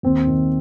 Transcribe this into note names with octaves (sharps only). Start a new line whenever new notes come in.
D#2 C4
D#3